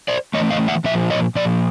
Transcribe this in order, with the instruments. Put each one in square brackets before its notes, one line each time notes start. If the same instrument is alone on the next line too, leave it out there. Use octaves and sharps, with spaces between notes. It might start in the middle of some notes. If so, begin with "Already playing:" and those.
[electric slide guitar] C5 D5
A2 E3 A3 C#5 D#5
D#5 F5
E5 F#5
A#2 F3 E5
C#5 D#5
A#2 F3 D5